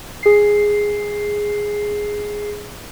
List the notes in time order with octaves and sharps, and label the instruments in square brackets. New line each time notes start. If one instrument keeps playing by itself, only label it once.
[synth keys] G#4 C7